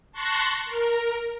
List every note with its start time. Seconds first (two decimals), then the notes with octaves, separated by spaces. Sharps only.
0.12 A5 C6 C#6 F#6 A#6
0.65 A#4